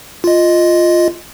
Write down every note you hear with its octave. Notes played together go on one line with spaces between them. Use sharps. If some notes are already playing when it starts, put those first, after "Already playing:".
F4 D#5